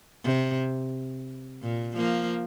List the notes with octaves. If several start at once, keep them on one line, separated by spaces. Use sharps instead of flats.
C3
A#2
F3 A#3